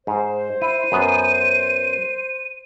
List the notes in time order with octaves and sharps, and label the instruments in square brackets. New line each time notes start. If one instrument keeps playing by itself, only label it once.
[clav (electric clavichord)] G#2 [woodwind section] C5
[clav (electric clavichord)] E4 [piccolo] D#7
[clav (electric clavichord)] F#2 B3